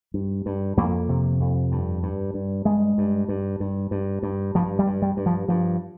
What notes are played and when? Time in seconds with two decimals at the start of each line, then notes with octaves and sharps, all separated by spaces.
0.14 G2
0.46 G2
0.77 F2 A#3
1.09 C3
1.40 F2
1.72 G2
2.03 G2
2.34 G2
2.65 G2 G#3
2.98 G2
3.28 G2
3.60 G2
3.91 G2
4.23 G2
4.55 G2 F3
4.79 G3
4.87 G2
5.02 G3
5.17 G2
5.26 F3
5.48 G2 F3